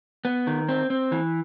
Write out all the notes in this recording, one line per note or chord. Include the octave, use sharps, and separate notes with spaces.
B3
D#3
C4
C4
E3